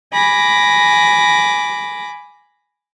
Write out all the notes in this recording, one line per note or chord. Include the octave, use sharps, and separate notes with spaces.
G#5 B5 D6 A#6